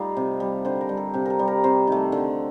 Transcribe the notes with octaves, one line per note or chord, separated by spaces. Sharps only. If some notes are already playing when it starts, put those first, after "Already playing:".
Already playing: G3 A3 D#4 F4
C3
G3
D3 C5
A#4
G3
A4
C3 G4
A4 A#4
G3
A#4
C3 C5
D#3 A3
D3